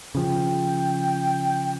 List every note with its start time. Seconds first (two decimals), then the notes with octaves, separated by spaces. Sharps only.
0.15 C#3 F3 G5